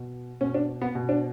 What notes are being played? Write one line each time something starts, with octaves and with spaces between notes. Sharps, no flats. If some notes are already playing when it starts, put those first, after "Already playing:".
Already playing: B2
B2 C#4
D4
B3
B2
D4